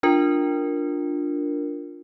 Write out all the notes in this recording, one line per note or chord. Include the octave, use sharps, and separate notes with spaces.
D4 F4 A#4